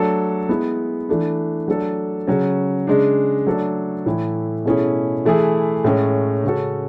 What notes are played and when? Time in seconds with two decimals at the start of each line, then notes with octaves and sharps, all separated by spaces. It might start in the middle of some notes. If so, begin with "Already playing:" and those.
Already playing: F#3 A3 D4 A4
0.49 G#3 B3 E4
1.09 E3 A3 D4
1.68 F#3 A3 D4 A4
2.27 C#3 F#3 C#4
2.87 C#3 G#3 D4
3.47 F#3 A3 D4 A4
4.06 A2 E3 A3 E4
4.65 B2 A3 C#4 E4 G#4
5.26 E3 A3 E4 G#4
5.84 A2 G#3 C#4
6.44 C#3 G#3 C#4 F#4 A4